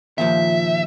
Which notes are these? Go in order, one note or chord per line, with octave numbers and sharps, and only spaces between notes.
D#2 A#2 F3 E5